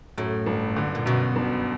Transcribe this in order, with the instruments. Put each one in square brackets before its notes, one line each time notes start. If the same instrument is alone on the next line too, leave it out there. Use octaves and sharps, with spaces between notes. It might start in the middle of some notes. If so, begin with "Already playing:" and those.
[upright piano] F#2 [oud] A2
[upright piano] G1
D3
[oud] A#2
[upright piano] F#2 [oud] B2
[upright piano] G1